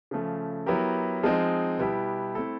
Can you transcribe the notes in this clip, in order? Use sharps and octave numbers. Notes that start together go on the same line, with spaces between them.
C#3 F3 A3
F#3 B3 E4 G4 A#4
F3 G#3 C4 D#4
B2 G3 B3 E4 G4
A3 C4 E4 A4